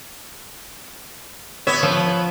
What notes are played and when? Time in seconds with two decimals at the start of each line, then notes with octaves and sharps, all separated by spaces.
1.67 B3 C#5 E5
1.83 F3